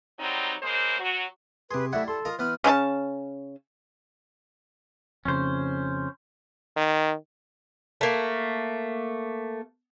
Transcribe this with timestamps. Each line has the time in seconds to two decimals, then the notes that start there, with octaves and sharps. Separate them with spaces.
0.18 F#3 G3 C4 D#4
0.61 C#3 G#3 A#3 C5
0.99 F#3 F#4
1.71 C3 G4 G#4 B4 C6
1.93 G3 A3 E4 E5 F#5
2.08 A4 C6
2.25 F4 A#4 D#5
2.39 E3 B3 B4 F6
2.64 C#3 C#4 E4 A5
5.25 F2 C#3 C#4 C5
6.77 D#3
8.01 A3 A#3